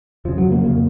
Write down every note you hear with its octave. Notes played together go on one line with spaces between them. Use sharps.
F2 C#3 F3
F#3
A#3
F2 C#3 A#3